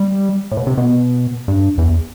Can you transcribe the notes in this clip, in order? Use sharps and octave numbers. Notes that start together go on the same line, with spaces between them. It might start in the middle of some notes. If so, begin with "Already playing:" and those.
Already playing: G3
A2
B2
C3
B2
G2
E2